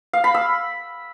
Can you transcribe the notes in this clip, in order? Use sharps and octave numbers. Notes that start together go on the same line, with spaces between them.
F5
B5
E6